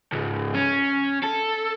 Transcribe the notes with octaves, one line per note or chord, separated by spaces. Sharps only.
C#2 G#2
C#4
A4